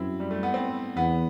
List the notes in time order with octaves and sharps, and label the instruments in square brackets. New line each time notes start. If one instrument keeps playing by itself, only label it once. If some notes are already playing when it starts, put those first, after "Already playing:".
Already playing: [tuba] F#2 [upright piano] C4 E4
[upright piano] G3
A3
B3
C4
[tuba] E2 [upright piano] B3